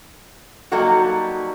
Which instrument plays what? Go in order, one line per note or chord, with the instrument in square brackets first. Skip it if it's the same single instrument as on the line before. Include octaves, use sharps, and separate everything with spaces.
[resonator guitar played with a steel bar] F#3 G3 A#3 D#4 F#4 A4